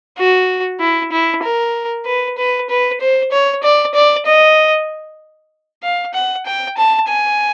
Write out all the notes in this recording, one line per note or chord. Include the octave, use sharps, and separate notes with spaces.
F#4
E4
E4
A#4
B4
B4
B4
C5
C#5
D5
D5
D#5
F5
F#5
G5
A5
G#5